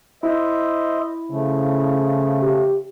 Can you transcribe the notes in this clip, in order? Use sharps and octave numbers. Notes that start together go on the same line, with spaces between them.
E4 C5 D#5 E5
C#3 F3 A3
G4